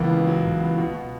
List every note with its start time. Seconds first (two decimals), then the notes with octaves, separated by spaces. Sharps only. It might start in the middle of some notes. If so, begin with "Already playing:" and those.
Already playing: C#2 E3 A#3 B3
0.09 C#3
0.27 F#3
0.44 C#2
0.60 B3
0.78 B2
0.94 B2